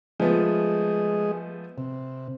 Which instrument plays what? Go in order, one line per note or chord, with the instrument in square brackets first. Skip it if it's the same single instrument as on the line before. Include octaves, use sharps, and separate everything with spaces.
[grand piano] F3 A3 B3 [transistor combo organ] G#3 G#4 D#5
[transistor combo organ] C3